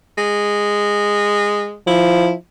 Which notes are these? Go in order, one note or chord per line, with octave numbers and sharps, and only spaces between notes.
G#3
F3 E4